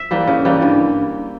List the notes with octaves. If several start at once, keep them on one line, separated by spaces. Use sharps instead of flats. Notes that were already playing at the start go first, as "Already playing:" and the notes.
Already playing: E5
E3 G3 A#3
C#3
E3 G3 A#3
G2